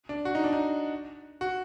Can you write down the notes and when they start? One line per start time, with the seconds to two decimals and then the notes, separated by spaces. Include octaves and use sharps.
0.09 D4
0.25 F#4
0.35 D#4
0.44 D4
0.53 D#4
1.41 F#4